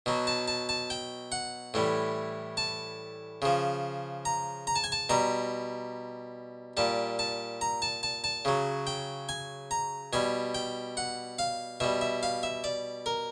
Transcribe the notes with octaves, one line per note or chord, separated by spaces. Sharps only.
B2 F#3
A5
A5
A5
G5
F#5
A2 E3 G3
A5
C#3 F3
A#5
A#5
A5
G#5
A5
B2 G3 A#5
A#2 G3 A5
A5
A#5
A5
A5
A5
C#3 F#3
G5
G#5
A#5
B2 G3 G#5
G5
F#5
F5
B2 G3 E5
E5
F5
E5
D5
A#4